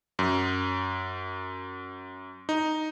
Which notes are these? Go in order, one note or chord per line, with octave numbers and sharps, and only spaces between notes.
F#2
D#4